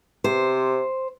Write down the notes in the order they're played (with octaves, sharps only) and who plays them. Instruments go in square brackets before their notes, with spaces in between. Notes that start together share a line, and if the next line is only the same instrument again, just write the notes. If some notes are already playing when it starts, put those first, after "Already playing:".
[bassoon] C3 [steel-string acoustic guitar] C5